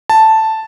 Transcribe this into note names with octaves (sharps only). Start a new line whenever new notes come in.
A5